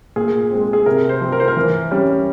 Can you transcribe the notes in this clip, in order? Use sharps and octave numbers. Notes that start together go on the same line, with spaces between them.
A#2 G#4
G#3 C4
G#4
C3 A#4
C5
F3 C4
A#4
C5
A#4
E3
G3 C#4